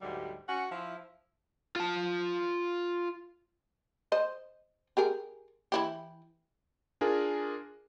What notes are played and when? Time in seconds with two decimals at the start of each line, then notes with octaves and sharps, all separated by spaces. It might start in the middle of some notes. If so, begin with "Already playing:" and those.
0.01 D2 G#2 F#3 G3
0.49 C#4 F#4 F#5
0.72 F3 E4
1.76 F4 A5
4.12 C5 D#5
4.97 G4 G#4 A#4
5.72 E3 E4 G4
7.01 D4 F4 G#4 A#4 G#5